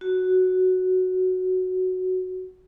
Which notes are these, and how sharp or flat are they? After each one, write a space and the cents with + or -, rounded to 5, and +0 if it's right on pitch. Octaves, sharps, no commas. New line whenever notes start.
F#4 +0